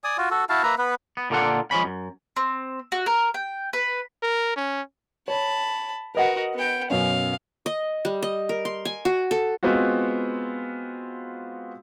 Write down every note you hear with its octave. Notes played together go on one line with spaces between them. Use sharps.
D5 G#5 D#6
F4 F#4
F#4 A4
E4 F#4 F5 A5
A#3 B4 E5 A#5
B3 B4
B3
A#2 D3 A#3 F4 A4 F#5
F3 G#3 C#4 B5
F#2
C4
F#4
A#4
G5
B4
A#4
C#4
C#5 A5 B5
F#4 A#4 B4 D#5 F#5
B3 G5
F#2 B2 C#4 F5
D#5
G3
D#5
A#4
C6
G#5
F#4
A4
G#3 B3 C4 F4 F#4